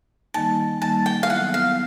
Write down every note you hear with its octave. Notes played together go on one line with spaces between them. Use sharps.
D#3 G3 A#3 D#4 A5
D#3 G3 A#3 D#4 A5
G5
F5
F#3 B3 E4 F#5
F5